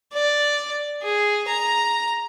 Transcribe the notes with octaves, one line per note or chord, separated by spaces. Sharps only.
D5
G#4
A#5